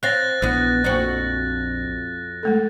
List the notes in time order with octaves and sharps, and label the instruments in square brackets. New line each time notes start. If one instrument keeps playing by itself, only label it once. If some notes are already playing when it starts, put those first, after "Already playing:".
[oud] C4 F5 [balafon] C#5 [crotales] F#6 A6 A#6
[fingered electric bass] A#1 [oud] E3 B3
[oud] F2 F3 F#4 [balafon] A#3 C5 D5
[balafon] G#3 A3 A4